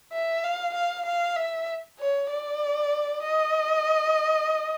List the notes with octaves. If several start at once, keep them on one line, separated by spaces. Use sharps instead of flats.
E5
F5
F5
F5
E5
C#5
D5
D#5